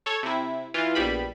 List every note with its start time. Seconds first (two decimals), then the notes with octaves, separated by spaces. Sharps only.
0.06 A4 C#5
0.23 C3 E4
0.74 E3 F4
0.95 A#1 B2 G3 B5